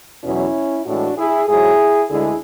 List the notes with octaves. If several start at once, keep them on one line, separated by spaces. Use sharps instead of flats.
E2 B2 F#3 C#4 E4
A2 E3 G#3 D4 F#4
E4 G#4
G#2 F#3 E4 G#4
D2 D3 G#3 E4 G#4